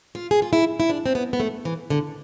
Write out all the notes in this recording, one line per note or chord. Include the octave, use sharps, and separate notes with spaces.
F4
G#4
F4
E4
E4
D4
C4
B3
B3
A3
E3
D3